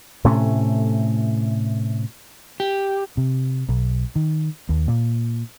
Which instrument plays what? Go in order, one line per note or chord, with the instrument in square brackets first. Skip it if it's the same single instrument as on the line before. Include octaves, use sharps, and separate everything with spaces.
[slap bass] A2 C3 A3 C#4
[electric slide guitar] G4
[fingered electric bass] C3
B1
D#3
D#2
A#2